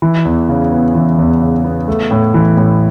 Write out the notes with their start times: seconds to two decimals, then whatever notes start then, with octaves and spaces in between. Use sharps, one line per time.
0.02 E3
0.25 E2
0.49 C#3
0.72 B3
0.95 E3
1.18 E2
1.42 C#3
1.64 B3
1.88 A3
2.11 A2
2.34 E3
2.57 A2